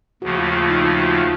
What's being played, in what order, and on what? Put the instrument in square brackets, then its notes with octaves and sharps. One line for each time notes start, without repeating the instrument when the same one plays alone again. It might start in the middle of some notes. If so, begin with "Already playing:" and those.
[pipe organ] D#2 C#3 F3 A3 [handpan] F#4
[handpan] F4
D#4
F4
F#4
F4